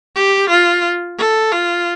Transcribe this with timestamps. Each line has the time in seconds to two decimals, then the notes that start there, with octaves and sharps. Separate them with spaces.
0.15 G4
0.49 F4
1.18 A4
1.52 F4